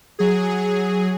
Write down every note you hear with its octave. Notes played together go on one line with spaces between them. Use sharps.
F#3 G#4